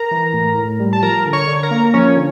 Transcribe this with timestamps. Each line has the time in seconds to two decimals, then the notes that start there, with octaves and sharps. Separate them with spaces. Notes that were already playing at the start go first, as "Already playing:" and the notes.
Already playing: A#4 A#5
0.11 E3
0.33 A2
0.57 A2
0.79 G3
0.93 A5
1.02 F3 A#4 A#5
1.26 D3
1.33 C#5 C#6
1.47 D3
1.63 A#4 A#5
1.71 A#3
1.94 F3 C#4 C#5
2.16 D3